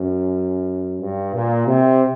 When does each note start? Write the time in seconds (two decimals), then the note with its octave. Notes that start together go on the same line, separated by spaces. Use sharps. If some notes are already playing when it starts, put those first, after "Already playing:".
Already playing: F#2
1.00 G2
1.34 A#2
1.67 C3